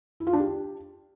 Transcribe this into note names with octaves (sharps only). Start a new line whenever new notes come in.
E4
F4
D4
G4